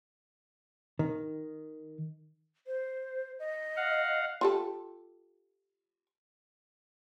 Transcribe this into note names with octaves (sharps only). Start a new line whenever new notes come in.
D#3
C5
D#5
F5 F#5
F4 G4 A4